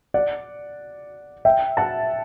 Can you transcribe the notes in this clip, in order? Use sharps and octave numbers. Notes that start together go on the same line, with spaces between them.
D5 F#5
E5 G5
F#5 A5